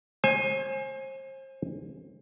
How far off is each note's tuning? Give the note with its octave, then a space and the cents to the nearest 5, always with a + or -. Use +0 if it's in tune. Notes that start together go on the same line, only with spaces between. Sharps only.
C5 +35 G#5 +0